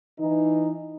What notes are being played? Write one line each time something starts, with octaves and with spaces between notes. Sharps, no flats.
E3 D#4